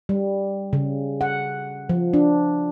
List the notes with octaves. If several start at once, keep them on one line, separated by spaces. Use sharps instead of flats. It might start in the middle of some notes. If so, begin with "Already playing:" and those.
G3
C#3
F#5
F3
D4